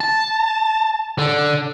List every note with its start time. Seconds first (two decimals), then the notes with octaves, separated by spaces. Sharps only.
0.01 A5
1.19 D3